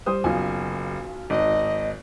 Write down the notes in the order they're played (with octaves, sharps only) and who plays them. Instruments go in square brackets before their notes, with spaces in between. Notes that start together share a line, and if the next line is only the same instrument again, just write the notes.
[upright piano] G3 C5 D#6
[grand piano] F#1 [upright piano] B1 F4 G#5
[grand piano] G#1 D#4 [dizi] D#5